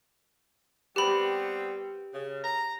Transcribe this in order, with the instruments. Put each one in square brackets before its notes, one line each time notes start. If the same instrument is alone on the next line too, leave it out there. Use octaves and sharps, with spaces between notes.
[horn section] G3 B3 C4 [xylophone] G4 B5
[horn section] C#3
A#5